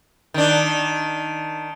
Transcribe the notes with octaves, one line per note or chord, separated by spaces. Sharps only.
D#3 D4